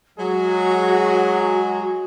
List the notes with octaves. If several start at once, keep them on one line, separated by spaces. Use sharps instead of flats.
F#3 G#3 F#4 G#4